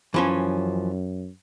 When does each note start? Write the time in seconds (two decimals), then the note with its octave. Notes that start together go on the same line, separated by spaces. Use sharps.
0.14 F#2 E3 F3 C#4